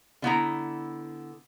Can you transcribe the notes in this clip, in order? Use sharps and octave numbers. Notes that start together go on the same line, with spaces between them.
D3 B3 E4 A#5